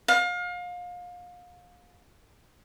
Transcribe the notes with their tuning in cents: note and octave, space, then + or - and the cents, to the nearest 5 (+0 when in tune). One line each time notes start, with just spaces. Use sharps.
F5 +30